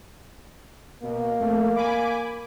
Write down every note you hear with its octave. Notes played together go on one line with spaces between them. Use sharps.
B2 A#3
F2 A3
G#5 B5 D6